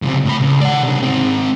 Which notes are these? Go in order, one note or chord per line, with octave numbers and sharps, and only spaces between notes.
C#2 C3
A2 B5
C#2
D5 F#5
C3 D4
G#2 C4